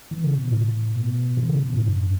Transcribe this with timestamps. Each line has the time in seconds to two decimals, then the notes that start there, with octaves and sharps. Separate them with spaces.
0.11 E3
0.24 C#3
0.37 B2
0.50 A2
0.95 B2
1.37 E3
1.49 C#3
1.62 B2
1.74 A2
1.87 F#2